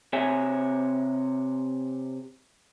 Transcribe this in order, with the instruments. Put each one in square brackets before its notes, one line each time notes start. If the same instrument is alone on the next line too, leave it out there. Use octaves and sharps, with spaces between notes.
[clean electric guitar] C3 C#5 E5 G#5